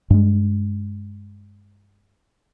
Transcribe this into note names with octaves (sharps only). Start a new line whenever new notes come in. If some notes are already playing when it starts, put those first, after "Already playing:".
G2 G#3